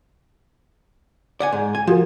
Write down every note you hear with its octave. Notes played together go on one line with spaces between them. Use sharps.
D5 F#5 G#5
G#2
G#5
F3 F4 F#4 A#4